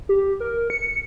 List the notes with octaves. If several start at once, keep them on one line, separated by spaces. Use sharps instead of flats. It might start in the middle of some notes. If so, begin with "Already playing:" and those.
G4
A#4
C#7